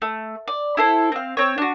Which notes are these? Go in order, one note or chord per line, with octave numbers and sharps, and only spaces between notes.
A3
D5
E4 A4 C5
C4 F5
C4 C#5
D4 F#4